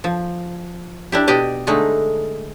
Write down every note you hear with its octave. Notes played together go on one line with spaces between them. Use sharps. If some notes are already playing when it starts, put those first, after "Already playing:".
F3
D4 E4 G4
B2 G4 D5 D#5
D3 G#3 A3 D#4